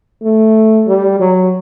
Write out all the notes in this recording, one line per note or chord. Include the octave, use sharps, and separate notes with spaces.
A3
G3
F#3